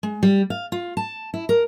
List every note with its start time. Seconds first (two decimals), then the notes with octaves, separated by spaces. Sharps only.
0.03 G#3
0.23 G3
0.50 F5
0.72 F4
0.97 A5
1.34 E4
1.49 A#4